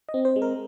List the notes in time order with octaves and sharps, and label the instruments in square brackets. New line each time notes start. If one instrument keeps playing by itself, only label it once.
[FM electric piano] D#5
C4
C5
G#3
A#4